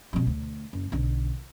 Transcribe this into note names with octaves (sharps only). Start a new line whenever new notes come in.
F2 B2
D2
F#1
B1 D3